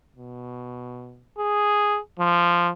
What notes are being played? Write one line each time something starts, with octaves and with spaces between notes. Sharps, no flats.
B2
G#4
F3